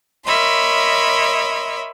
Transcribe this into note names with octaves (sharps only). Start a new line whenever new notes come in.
A#4 C#5 D#5 E5 B5 C6